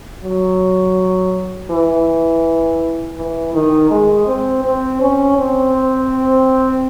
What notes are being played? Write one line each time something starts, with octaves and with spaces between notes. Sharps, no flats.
F#3
E3
E3
D#3
G#3
C4
C4
C#4
C4